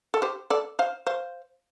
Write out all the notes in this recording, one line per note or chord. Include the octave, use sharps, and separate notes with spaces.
A4
G4 C5
A4 D5
C5 F5
C5 F5